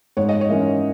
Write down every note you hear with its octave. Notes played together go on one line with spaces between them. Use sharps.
G#2 C#5
D#5
C#5
E3 A#3 C#4